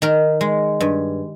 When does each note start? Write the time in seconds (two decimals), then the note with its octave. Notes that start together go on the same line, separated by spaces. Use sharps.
0.02 D#3 A#4
0.41 G#3
0.80 G2